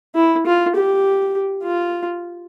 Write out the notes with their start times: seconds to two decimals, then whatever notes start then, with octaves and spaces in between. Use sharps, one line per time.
0.15 E4
0.46 F4
0.76 G4
1.64 F4